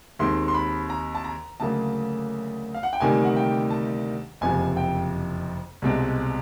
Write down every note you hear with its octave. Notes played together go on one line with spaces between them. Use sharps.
D#2 D#3 G#3 C4 C6
C6
B5
A#5
A5
A#5
D2 C#3 F#3 A#3 A5
F5
F#5
G5
D2 C3 D#3 G3 A#3 G#5
F#5
G5
A5
F#1 F2 C3 F3 G#5
G5
C2 B2 G#3 C4